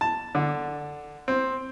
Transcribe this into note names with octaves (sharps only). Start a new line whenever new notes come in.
A5
D3
C4